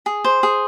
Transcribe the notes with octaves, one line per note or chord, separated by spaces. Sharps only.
G#4
C5
G#4